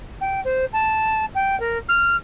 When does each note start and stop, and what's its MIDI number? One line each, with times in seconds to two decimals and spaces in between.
0.21 0.41 79
0.45 0.65 72
0.73 1.25 81
1.35 1.58 79
1.60 1.78 70
1.89 2.16 89